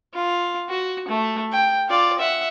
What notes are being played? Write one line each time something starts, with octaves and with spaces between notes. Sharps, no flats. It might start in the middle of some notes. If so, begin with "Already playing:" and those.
F4
F#4
A3
G5
F4 D5
E5 F#5